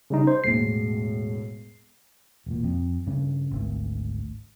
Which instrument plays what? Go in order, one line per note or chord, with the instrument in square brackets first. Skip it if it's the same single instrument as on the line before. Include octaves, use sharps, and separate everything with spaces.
[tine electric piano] C#3 G3 D#4
C5
[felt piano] E1 A2 [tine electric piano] C7
[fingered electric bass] E1 A#2
F2
G2 C#3
G#1 D2